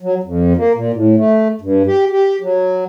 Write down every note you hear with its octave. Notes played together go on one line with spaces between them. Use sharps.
F#3
F2
A#3
A#2
A2
A3
G2
G4
G4
F#3